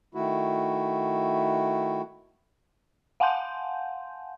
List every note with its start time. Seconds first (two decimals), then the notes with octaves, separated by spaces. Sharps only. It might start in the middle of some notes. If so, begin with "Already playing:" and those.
0.15 D#3 A3 E4 F#4
3.20 F5 F#5 G#5 A5 C6 G6